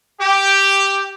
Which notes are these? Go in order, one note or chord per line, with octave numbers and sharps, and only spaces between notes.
G4